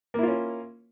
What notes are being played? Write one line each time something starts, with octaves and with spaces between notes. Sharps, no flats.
A#3 C#4 E4 F4